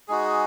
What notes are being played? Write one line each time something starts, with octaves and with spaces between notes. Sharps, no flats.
G#3 D#4 F#4 G#4